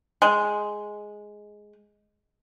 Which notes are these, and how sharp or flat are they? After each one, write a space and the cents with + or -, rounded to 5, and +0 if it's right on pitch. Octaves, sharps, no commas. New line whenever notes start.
G#3 +5